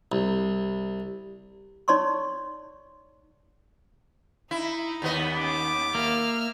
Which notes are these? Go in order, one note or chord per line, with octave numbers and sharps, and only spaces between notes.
C2
D#4 C#5 D5 C6 C#6
D#4 E4
D#2 B3 D#5
C#4 D6
A#3 E5 F6